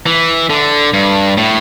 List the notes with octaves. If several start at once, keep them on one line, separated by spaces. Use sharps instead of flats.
E3
D3
G2
A2